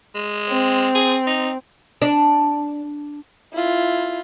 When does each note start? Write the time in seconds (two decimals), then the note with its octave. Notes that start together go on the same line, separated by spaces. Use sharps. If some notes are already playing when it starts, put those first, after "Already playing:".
0.15 G#3
0.50 C4
0.95 G#4
1.27 D#4
2.02 D4
3.53 E4 F4